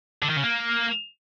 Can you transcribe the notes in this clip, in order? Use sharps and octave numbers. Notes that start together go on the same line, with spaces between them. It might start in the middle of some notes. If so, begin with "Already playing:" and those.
D3
D#3
C#3
A#3